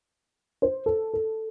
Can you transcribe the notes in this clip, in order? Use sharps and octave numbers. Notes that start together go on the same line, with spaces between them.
C5
A4
A4